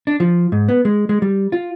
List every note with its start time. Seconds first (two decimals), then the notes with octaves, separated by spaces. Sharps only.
0.07 D4
0.20 F3
0.52 G#2
0.68 B3
0.85 G#3
1.09 G#3
1.22 G3
1.52 F4